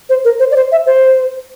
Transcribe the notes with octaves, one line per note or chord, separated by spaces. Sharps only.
C5
A#4
C5
D5
C5
E5
C5